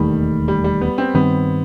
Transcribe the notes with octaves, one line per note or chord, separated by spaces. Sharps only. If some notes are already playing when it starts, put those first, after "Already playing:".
Already playing: E1 D#2 D#3 G3 A3
G3
G3
B3
C4
G2 D#3 G3 B3 C4